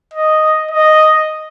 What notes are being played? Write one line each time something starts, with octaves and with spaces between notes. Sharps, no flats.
D#5
D#5